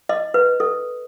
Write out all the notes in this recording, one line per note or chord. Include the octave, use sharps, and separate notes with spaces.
D#5
B4
A4